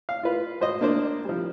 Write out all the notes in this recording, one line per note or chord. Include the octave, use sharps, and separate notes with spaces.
F5
F4 B4
G#1 C5 D#5
A#3 D4 C5
F3 G3